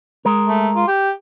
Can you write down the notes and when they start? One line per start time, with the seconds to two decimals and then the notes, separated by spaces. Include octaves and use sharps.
0.25 G#3 A#4
0.48 A3
0.76 F4
0.88 G4